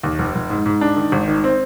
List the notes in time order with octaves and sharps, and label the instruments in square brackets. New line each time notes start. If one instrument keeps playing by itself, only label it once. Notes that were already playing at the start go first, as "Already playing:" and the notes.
[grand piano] D#2
F1
F1
G#2
G#2
D4
D#3
G#1
D#3
C4